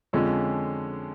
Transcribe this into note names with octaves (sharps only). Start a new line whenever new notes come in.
F2 D3 F3 G#3 C#4